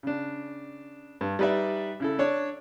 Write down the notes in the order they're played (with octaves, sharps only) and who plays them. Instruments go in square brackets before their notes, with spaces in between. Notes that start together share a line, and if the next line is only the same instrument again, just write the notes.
[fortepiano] C#3 D4
G2
G3 D#4 B4 D5 E5
C#3 E4 A4
D4 C#5 D5